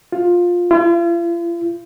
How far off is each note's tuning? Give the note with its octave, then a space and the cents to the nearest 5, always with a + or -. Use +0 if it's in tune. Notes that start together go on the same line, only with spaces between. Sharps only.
F4 +10
F4 -45